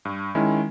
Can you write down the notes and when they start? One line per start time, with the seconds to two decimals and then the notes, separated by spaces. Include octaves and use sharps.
0.05 G2
0.35 D#3 G#3 C#4 E4